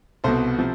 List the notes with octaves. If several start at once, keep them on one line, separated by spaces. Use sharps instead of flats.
C2 B2 A4 C5
C3 F3